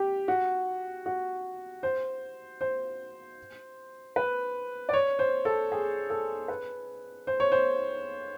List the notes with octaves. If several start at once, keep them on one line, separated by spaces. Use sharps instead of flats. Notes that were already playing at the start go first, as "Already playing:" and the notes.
Already playing: G4
F#4
F#4
C5
C5
B4
D5
C#5
C5
A4
G#4
A4
B4
C5
C#5
C5